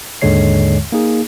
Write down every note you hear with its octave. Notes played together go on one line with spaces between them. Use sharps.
D#2 G#2 D3 G#3 C#5 C7
A#3 D#4 G#4